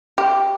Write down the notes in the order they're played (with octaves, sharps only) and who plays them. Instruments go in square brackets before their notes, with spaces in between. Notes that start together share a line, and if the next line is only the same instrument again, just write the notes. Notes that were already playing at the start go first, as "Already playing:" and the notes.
[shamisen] G4